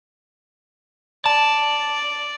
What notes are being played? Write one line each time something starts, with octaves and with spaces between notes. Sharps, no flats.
D5 A5